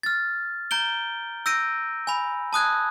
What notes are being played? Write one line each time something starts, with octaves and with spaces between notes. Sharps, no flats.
F6 A6
A#5 G6 D7 G7
E6 G6 A#6 D7 D#7
G#5 B5
A5 D#6 F#6 G#6